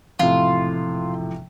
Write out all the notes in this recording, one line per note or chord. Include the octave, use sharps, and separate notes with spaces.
E1 A2 C3 F3 F4